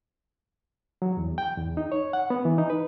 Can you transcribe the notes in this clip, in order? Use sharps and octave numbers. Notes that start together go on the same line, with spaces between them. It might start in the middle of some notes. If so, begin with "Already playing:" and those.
F#3
E2
G5
E2
D#4
C#5
F#5
B3
E3
D#4
B4